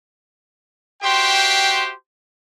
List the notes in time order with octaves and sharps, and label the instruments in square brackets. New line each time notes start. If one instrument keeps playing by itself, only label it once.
[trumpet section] F#4 G4 C5 E5 G5 C6